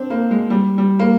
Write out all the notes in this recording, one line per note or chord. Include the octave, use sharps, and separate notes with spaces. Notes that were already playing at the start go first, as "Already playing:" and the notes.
Already playing: C4 D4
A#3
G#3
G3
G3
A#3